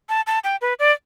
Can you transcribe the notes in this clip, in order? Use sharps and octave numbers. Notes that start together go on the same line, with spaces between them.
A5
A5
G5
B4
D5